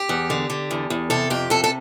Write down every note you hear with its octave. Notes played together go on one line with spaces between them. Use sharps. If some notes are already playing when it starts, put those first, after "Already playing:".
Already playing: G4
E2
D3
D3
E2
E2
C3 A4
F2 G4
C3 A4
A4